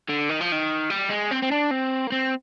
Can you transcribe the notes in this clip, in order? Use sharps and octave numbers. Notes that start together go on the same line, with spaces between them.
D3
D#3
F3
D#3
G3
G#3
C4
C4
D4
C4
A#3
C4